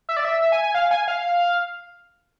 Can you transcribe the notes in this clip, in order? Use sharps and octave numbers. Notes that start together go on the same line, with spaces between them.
E5
D5
E5
E5
G#5
G#5
F5
G#5
F5